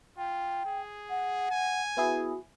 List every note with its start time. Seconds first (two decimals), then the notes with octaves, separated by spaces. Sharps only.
0.18 F4 G5
0.66 G#4
1.10 F#5
1.51 G#5
1.97 B3 E4 F#4 G#4